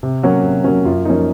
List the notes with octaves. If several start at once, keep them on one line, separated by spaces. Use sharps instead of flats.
C3
F#3 A#3 C#4 F#4
C3
F#3 A#3 C#4
F#2 F4
F3 A#3 C#4 D#4